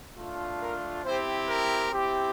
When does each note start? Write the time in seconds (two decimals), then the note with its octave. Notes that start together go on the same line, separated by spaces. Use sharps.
0.17 A3 D4 F4
0.60 A#4
1.04 C4 E4 G4 C5
1.48 A#4
1.91 C4 E4 G4